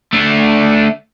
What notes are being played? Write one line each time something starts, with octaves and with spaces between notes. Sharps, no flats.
A3 D4